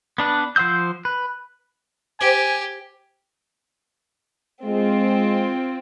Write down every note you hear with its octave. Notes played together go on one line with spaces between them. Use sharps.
B3 D4 B4
F3 C5 F#5 E6 G6
B4
G4 C5 G#5
G#3 C4 F4